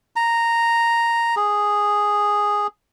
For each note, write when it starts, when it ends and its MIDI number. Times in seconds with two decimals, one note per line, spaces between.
0.16 1.35 82
1.36 2.67 68